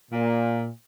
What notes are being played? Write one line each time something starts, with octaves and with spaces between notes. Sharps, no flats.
A#2